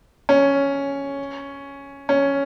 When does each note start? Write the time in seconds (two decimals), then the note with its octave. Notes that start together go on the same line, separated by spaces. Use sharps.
0.29 C#4
2.09 C#4